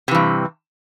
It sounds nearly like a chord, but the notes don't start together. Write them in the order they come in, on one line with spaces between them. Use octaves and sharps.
C3 E3 G2